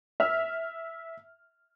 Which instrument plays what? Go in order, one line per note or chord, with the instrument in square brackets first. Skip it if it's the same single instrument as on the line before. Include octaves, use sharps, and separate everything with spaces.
[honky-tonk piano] E5 F6